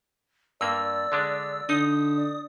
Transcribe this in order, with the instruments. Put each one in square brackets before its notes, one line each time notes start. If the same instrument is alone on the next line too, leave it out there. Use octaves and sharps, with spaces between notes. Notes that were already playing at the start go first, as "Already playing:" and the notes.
[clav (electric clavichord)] G2 A#3 [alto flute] D5 [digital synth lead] E6
[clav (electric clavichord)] D3 G#3 D4
[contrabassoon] D3 [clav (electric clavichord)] D#4 D#5 [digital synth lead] D#6
[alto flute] D5